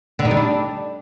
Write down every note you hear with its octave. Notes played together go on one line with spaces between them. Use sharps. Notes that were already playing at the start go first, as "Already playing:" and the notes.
D3
D#4
G3
D4